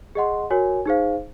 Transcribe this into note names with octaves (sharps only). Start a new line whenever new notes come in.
G#4 D#5 F#5 C6
F#4 A#4 C#5 G#5
D#4 G#4 C5 F5